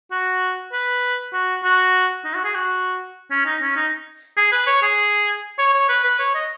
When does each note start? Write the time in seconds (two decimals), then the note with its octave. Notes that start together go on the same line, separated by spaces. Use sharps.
0.11 F#4
0.72 B4
1.33 F#4
1.63 F#4
2.25 D#4
2.34 F#4
2.44 G#4
2.55 F#4
3.31 C#4
3.46 D#4
3.62 C#4
3.76 D#4
4.37 G#4
4.52 B4
4.67 C#5
4.82 G#4
5.59 C#5
5.74 C#5
5.89 B4
6.04 B4
6.19 C#5
6.35 D#5